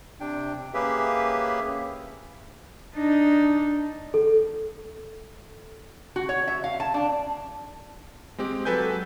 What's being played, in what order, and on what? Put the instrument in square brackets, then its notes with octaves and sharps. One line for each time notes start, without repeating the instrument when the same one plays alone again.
[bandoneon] C3 D4 G5
A#3 C#4 G4 G#4 B4 E5
[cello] D4 D#4
[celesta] A4
[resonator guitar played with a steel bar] F#4
C#5
E5
F5
A5
D4
[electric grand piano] G#3 C4 G4
F#3 A4 B4 G#5 G6